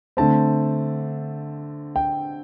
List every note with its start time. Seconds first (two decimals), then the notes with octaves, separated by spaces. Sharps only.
0.17 D3 A3 C4 A5
1.96 G5